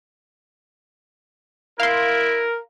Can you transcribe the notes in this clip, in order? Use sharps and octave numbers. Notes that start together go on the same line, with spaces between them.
E4 A#4 F5 C6